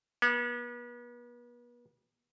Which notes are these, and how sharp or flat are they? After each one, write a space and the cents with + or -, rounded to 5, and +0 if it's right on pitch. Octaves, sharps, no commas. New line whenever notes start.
B3 -40